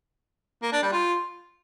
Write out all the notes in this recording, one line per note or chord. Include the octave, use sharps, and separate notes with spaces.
A#3
D4
G3
F4